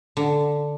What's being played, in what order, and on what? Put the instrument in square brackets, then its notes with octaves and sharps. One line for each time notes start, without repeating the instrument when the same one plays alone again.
[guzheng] D3